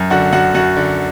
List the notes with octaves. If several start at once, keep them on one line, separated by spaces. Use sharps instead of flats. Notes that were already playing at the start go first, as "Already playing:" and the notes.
Already playing: F#2
D3 F#4 F#5
F#2 F#4 F#5
F#2 F#4 F#5
D3